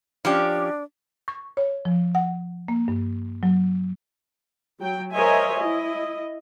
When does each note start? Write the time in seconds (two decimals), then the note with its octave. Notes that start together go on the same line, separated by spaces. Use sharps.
0.25 F3 C#4 D4 G4
1.28 C#6
1.57 C#5
1.85 F3
2.15 F#5
2.68 A#3
2.88 G2
3.43 F#3
4.80 F#3 G5
5.12 A#4 C5 C#5 D#5 E5 G#5
5.58 E4 D#5